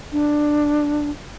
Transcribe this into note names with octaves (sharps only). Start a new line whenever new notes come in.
D4